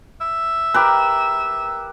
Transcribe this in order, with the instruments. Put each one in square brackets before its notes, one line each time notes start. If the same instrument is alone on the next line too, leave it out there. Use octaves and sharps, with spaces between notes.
[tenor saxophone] E5
[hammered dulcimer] G4 A#4 B4